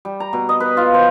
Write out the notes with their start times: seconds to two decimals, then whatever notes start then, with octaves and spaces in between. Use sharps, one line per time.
0.05 G3
0.20 A#5
0.33 B2
0.49 D#5
0.60 B4
0.77 F4
0.94 C5